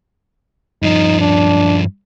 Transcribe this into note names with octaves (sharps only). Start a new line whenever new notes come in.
G2 F3 D#4
D4